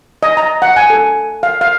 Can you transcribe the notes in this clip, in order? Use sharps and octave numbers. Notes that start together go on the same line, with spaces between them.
D#5
A#5
F#5
G#5
A4
F5
F5